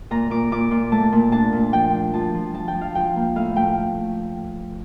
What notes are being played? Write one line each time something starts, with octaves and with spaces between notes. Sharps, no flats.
A#2 A#5
A#2 D6
A#2 D6
A#2
A3 A5
A#2
D4 A5
A#2
F3 G5
D4
F3 A5
F3
F3 A5
G5
F3
F5
F3 G5
A#3
A2 F5
A3 G5